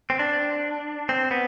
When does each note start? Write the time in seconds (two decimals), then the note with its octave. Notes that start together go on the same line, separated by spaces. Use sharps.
0.10 C4
0.19 D4
1.09 C4
1.31 B3